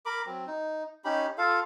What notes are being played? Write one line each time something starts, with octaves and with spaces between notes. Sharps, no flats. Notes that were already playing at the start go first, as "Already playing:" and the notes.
A#4 B5 D6
F#3 C4
D#4
C#4 D#4 G4 B5
F4 A4 F5